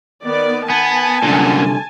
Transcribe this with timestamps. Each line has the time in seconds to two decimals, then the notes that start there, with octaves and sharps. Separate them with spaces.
0.25 D#3 B3 D5
0.70 B3 G#5 A5
1.23 C2 F#2 A#2 D3 A4